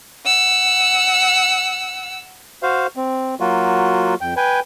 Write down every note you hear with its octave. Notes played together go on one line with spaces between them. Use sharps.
F#5 E6
F#4 C5 F5
C4
F#3 A#3 F4 F#4
F2 G5
B4 G5 G#5